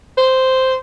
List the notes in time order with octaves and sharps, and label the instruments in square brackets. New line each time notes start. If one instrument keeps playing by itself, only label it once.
[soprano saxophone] C5